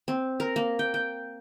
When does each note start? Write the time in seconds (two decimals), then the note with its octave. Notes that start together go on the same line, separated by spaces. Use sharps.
0.08 C4
0.40 A#4
0.56 A#3
0.79 G5
0.94 G5